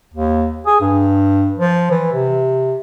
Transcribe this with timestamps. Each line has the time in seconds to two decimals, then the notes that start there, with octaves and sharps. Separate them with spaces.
0.14 D#2
0.66 G#4
0.81 G2
1.58 F3
1.91 E3
2.13 C3